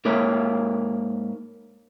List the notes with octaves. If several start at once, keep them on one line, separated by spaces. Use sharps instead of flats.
G#2 A#3 A#4 C#5 E5